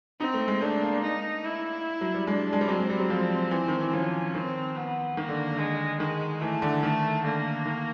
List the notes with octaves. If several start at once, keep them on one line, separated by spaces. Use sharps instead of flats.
C4 D#4
A3
G#3
A3 D4
A#3
D#4
E4
F#3
G3
G#3 D4
G#3
G3
F#3 C4
G#3
G3
F#3
F3
E3
D#3
E3
F3 C#4
D#3 C4
B3
D#3 A#3
D3
D3
G#3
D#3 G#3
E3 A3
D3
D#3 A3
D3 A#3
D#3